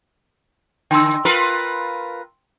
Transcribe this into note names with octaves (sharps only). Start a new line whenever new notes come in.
D3 G5 C6 E6
F4 A#4 B4